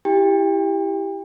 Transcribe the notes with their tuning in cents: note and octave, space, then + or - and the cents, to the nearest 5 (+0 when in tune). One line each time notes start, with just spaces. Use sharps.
E4 +0 G4 +5 G5 +35